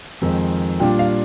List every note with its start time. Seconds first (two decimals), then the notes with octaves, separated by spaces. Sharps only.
0.22 F2 D#3 G#3 C4 D#4
0.80 A#2 G3 D4 F4 G5
0.99 F5